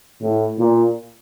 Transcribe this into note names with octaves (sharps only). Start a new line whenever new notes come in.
A2
A#2